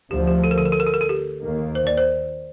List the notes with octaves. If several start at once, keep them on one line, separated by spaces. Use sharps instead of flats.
D2 D3 F3 G4
G4
A4
A#4
A4
A#4
A4
A#4
A4
A#4
A4
G4
D#2 D#3 A#3
C5
D5
C5